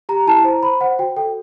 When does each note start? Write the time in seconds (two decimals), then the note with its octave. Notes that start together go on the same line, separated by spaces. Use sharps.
0.09 G4 A#5
0.27 E4 A5
0.44 C5 A#5
0.63 C5 B5
0.81 C5 F#5
0.99 F#4 G5
1.16 A4 G5